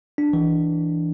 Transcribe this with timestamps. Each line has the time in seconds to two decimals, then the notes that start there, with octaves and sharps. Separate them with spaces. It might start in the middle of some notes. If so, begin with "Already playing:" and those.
0.18 D4
0.33 E3